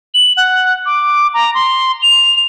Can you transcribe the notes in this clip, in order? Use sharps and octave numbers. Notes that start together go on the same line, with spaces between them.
F#7
F#5
D6
A#5
C6
F7